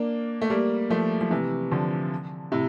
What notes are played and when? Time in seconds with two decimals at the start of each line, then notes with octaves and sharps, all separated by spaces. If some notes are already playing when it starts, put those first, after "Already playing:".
Already playing: A#3 D4
0.42 A3
0.50 G3 A#3
0.90 F3 A3
1.21 F3
1.31 C3 E3
1.71 D3 F3
2.52 A2 C3